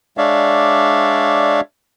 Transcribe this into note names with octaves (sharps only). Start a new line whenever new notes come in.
G#3 D4 C#5 D5 E5 F5